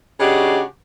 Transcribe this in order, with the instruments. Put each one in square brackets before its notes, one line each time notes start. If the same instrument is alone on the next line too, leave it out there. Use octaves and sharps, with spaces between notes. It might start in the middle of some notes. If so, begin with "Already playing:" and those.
[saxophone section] C#3 G#3 D4 F#4 G4